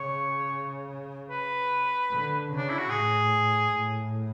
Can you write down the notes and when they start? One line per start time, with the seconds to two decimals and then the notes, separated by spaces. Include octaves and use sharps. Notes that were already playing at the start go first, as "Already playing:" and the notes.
Already playing: C#3 C#5
1.31 B4
2.10 D3
2.51 C#3
2.58 D4
2.69 E4
2.79 F#4
2.90 A2 G#4
3.69 A2